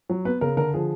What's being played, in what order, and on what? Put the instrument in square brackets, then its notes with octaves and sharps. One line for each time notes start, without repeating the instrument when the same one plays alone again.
[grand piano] F#3
B3 B4
C#3 A#4
D3 A#4
F3 G#4